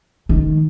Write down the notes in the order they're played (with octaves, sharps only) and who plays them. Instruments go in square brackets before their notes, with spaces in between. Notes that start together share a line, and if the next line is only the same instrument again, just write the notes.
[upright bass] D#3